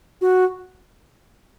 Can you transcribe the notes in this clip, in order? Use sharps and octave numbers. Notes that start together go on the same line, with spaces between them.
F#4